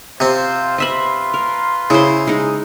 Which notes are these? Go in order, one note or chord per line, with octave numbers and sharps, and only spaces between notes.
C3 C4 F4 C5
F4 B4 D#5 E5 B5 C6
A#4
C#3 E4 C5
G#3 D#4